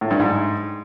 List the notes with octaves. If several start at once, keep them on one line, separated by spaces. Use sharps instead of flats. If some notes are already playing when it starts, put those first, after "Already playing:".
A2
G2
G#2